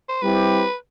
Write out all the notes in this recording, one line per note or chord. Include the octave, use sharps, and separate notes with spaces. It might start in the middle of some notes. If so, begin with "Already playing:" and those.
C5
G3 C4 E4 G4 B4